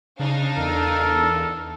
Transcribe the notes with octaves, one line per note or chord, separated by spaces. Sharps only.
C#3 D4 D#4 F5
E2 A4 A#4